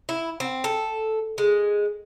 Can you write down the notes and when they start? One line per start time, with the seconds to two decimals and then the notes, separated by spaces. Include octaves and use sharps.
0.09 E4
0.40 C4
0.64 A4
1.38 G#3